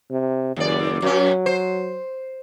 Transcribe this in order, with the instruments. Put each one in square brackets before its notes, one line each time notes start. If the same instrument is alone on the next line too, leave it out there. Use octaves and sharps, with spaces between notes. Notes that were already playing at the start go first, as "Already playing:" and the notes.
[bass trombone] C3
[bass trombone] F#1 [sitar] D#2 D5
[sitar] F#2 C#4 [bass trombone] F#3
[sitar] C5